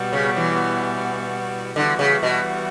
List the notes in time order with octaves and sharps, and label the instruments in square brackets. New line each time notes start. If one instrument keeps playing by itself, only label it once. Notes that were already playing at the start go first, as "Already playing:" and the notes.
Already playing: [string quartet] B2 G3 B3 F#4
[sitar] C#3
E3
[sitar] D3 [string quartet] E3 G3 B3 F#4
[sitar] C#3
B2